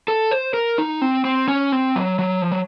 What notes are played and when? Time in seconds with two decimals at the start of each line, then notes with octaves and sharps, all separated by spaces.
0.08 A4
0.31 C5
0.54 A#4
0.78 D#4
1.02 C4
1.25 C4
1.48 C#4
1.72 C4
1.96 F#3
2.19 F#3
2.42 F3
2.52 F#3